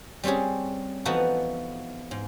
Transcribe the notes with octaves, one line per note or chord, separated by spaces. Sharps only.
G3 C4 C#4 G4 G#4
E3 F3 B3 D#4 F#4 A4
G#2